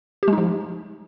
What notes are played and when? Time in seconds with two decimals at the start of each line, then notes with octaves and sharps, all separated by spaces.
0.23 G4
0.28 G#3
0.33 D#4
0.38 F3